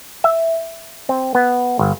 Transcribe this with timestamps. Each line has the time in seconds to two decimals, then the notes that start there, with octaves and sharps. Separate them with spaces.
0.24 E5
1.09 C4
1.35 B3
1.79 G1